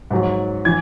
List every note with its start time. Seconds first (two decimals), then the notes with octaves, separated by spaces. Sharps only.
0.11 G#2 F#3
0.65 E3 G#6